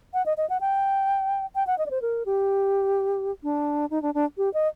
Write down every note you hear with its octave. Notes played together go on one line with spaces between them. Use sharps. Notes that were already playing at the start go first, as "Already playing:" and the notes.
F#5
D#5
D#5
F#5
G5
G5
F#5
D#5
D5
C5
A#4
G4
D4
D#4
D4
D4
G4
D#5